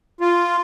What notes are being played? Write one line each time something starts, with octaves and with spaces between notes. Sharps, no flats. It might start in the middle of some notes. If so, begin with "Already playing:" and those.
F4